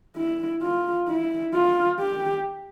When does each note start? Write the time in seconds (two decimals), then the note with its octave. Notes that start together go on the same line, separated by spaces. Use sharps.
0.17 E4
0.62 F4
1.08 E4
1.54 F4
2.00 G4